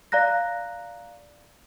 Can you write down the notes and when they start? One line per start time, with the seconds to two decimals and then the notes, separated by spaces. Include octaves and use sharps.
0.12 D5 F5 A#5 F#6 A#6